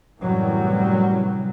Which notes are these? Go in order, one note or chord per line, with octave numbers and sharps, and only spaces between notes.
F#2 A2 C3 E3 F#3 G3